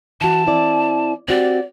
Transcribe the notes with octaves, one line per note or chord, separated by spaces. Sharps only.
E3 F#4 A5
C4 E4 D5
C4 F#4 G4 D5